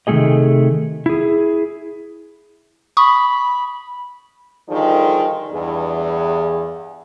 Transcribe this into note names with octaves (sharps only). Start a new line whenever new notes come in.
C3 D#3 G3 A3 G#4 D#5
E4 G#4
B5 C#6 D#6
D3 D#3 F3 G3 D#4 G#4
E2 G2 G#4